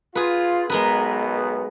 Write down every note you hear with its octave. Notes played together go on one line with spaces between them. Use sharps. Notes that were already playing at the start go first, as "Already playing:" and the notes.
F4 G#4 B4
B1 G#3 B3 A#4 B4